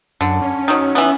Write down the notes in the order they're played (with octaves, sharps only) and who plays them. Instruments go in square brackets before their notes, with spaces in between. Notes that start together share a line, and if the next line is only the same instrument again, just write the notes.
[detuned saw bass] F#2 [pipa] D3
[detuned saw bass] C#4
[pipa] D#3 F#3
E3 B3